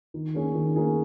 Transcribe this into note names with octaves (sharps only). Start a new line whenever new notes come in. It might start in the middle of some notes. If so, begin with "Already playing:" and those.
D#3
A#3 C#4 G#4
D#3
A#3 C#4 G#4